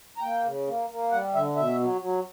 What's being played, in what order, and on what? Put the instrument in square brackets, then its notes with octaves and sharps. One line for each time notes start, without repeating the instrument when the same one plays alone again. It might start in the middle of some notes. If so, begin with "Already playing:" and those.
[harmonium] A#5
A#3 G5
C#3
A#3
A#3
G3 F#5
D3 E5
B2 E5
F#3
F#3